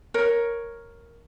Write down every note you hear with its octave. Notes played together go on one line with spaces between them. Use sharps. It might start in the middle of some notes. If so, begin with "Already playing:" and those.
A#4 C#5